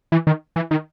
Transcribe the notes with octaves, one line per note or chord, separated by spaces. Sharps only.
E3
D#3
E3
D#3